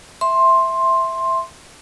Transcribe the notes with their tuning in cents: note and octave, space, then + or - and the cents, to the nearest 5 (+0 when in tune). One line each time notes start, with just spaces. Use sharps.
E5 +0 C6 +10